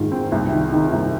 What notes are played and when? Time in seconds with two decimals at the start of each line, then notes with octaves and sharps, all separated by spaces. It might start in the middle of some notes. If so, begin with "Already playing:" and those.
Already playing: G#2 D#3 F4
0.12 C4
0.32 C2
0.52 D#3
0.72 D#3
0.92 C2